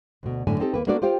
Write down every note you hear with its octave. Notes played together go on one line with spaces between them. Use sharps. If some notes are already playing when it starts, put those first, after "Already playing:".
D2 B2
F#2 A2 D3 A3 G#5 A5
C4 D#4 G4 A4
D#2 A#3 B4
A#3 B3 D4 F#4 A4 D5
F4 G4 C5 F5 G5